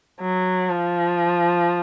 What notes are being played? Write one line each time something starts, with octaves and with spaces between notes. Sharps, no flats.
F#3
F3